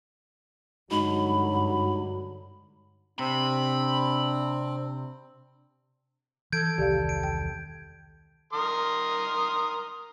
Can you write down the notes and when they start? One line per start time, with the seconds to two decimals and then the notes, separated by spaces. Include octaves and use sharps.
0.91 G2 D3 F#3 G#3 D#4 F#4 B5
3.19 C3 C4 D4 B5
6.52 E3 A4 G6 G#6 D7
6.78 E1 C2 D#3 G4 D5 F5
7.09 D7
7.23 G5
8.53 A#4 C6 D#6